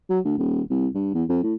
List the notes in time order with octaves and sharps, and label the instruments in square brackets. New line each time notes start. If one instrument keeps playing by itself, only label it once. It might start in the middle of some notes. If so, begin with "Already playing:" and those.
[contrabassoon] F#3
D2
D#1
C2
G2
E2
F2
A2